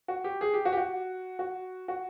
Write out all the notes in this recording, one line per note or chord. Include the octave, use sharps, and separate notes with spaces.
F#4
G4
G#4
G4
F#4
G4
F#4
F#4
F#4